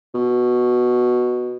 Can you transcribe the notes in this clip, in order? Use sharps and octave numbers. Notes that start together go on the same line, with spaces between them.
B2